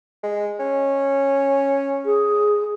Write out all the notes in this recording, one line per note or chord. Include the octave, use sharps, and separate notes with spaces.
G#3
C#4
G#4